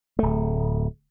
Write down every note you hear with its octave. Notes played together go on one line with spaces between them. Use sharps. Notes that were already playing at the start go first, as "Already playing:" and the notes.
D1 A3